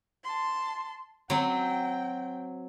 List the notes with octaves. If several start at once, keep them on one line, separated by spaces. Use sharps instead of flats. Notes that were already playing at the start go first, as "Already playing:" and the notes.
A5 C6
F#3 C4 G5